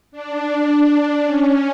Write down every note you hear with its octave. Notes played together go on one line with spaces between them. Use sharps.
D4
C#4